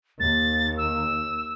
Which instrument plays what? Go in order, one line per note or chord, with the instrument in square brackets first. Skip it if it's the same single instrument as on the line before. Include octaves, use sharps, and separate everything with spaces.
[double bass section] D#2 [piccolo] A6
[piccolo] E6